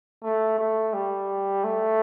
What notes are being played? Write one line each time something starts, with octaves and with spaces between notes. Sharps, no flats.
A3
A3
G3
A3